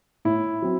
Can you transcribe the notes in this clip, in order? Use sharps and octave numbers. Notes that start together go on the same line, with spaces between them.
A2 E4
F#3 C4